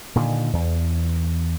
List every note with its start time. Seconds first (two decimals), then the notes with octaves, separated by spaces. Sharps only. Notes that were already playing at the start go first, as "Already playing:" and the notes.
0.16 A#2 D3 D#3
0.53 E2